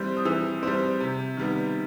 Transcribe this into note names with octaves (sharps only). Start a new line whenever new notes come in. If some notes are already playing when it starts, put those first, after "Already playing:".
Already playing: E3 G3 C4
D#6
E3 E6
G3 C4
C3
D#3 G3 B3